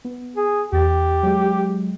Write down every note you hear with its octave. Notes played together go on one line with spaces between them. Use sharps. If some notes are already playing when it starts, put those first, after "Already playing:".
B3
G#4
E2 G4 A6
F#3 G#3